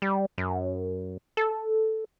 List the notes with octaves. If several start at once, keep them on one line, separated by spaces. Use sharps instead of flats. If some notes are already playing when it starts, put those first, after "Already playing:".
G3
F#2
A4